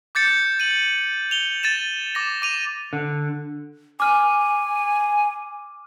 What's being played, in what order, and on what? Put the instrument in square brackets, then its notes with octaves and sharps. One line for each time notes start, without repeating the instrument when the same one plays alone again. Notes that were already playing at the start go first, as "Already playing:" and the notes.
[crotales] D6 G6 A6 C#7
D#7 F#7
F7 G7
A6 D#7 E7
D6 A#6
D6 D#7 F7
[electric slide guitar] D3
[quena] G#5 [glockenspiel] D6 F6